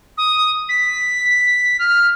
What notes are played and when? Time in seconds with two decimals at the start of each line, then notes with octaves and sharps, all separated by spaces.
0.17 D#6
0.68 B6
1.79 F6